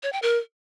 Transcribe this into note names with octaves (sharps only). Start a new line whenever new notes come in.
C#5
G5
A#4